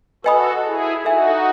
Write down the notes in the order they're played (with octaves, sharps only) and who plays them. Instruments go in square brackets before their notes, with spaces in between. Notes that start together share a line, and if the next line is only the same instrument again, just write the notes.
[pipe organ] F#4 A4 [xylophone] B4 D#5 G#5 B5 D#6
[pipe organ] E4 G#4
[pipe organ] D#4 F#4 [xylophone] A4 E5 G#5